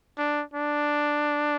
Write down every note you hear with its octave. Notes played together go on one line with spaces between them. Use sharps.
D4
D4